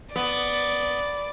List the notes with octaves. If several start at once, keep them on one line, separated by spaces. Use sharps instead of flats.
B3 D5